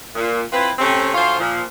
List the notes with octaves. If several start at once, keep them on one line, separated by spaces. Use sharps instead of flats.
A#2
C4 E4 F4 B4
C3 A3 C4 C#4
D2 F3 F4 C5 C#5 F5
A#2 F3